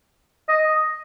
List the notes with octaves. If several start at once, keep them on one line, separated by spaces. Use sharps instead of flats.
D#5